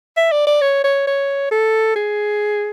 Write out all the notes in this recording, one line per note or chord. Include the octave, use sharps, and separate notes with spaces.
E5
D5
D5
C#5
C#5
C#5
A4
G#4